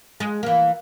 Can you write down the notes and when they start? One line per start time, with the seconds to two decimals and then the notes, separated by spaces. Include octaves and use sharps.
0.20 G#3
0.43 E3 A#3